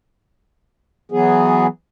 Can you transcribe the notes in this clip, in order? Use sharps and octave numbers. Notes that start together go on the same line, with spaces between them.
E3 F#3 B3 G#4